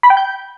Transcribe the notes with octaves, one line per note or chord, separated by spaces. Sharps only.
B5
G5
G6